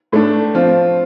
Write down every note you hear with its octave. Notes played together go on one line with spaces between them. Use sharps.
A2 A3 D4
F3 C4 F4